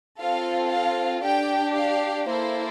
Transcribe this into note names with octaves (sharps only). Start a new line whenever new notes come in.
C4 F4 A4 F5
F5
D4 G4 G5
F5
A#3 E4 A4 C5